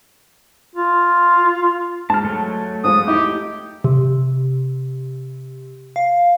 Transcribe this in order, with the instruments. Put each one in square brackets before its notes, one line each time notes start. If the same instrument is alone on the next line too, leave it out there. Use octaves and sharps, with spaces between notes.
[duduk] F4
[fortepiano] G#2 [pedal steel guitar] A5 F6
[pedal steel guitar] F#3 A3
[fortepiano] G#2 F3 [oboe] D#6
[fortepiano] D#4 E4 [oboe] G4
[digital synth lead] C3
F5